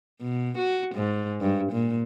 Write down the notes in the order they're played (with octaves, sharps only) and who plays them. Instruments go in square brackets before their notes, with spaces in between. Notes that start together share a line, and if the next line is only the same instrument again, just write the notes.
[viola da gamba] B2
F#4
G#2
G2
A#2